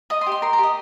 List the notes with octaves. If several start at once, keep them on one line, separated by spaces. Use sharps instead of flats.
D#5 D#6
C6
G4
C6
A#4 C6
A#5
G4
D#5